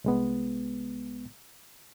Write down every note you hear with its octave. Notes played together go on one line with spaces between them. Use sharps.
C2 G#3 B3